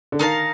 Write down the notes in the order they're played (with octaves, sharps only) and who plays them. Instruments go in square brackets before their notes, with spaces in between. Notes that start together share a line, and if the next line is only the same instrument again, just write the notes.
[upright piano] D3
[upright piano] D#3 [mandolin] D#4 A#4 F5 A5